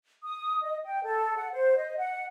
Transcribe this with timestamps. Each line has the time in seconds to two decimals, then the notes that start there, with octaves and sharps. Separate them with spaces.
0.23 D#6
0.63 D#5
0.85 G5
1.03 A4
1.37 F#5
1.53 C5
1.77 D#5
1.98 F#5